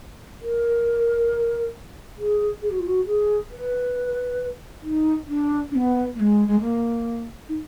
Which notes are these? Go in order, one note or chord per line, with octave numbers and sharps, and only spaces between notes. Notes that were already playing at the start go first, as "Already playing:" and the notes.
A#4
G#4
G#4
F#4
F4
F#4
G#4
B4
D#4
D4
D4
B3
A#3
G#3
G#3
A#3
D#4